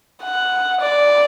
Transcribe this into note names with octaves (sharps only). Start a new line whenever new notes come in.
F#5
D5